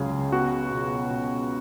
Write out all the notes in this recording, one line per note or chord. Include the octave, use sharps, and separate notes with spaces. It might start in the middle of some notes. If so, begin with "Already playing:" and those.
Already playing: C#2 C#3 F#3 G#4
B3 F#4
B2
B2